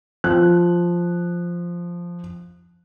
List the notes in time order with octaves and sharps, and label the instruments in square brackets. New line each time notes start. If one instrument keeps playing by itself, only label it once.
[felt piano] F3 F#6